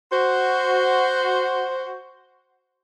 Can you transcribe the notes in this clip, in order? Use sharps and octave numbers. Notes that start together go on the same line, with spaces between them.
F#4 C5